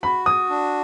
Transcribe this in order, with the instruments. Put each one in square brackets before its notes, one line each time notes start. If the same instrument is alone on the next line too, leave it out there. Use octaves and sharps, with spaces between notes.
[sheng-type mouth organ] F#4 [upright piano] B5
[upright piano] D#6
[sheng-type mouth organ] D4